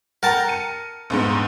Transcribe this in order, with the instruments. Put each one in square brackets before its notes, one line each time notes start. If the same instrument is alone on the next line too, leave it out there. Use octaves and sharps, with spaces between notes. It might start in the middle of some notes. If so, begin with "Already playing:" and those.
[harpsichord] A#4 A5 [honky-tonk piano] F#5 G5 A#5
[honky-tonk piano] C#7 D#7
A#1 E2 G#2